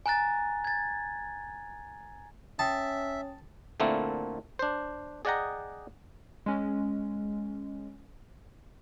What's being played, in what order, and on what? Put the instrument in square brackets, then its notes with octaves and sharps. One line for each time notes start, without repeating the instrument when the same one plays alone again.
[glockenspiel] G#5 A#5 F#6 A6
G#6 A6
[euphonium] C#4 [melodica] E5 [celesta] G5 D#6 [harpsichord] A5
[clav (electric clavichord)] A#2 D3 A3 A#3 C4 E4
D4 C5
G#4 D5 D#5 F#5 G5 A#5
[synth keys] G#3 C#4